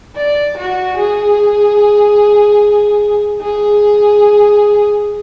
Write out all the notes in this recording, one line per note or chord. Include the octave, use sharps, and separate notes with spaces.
D5
F#4
G#4
G#4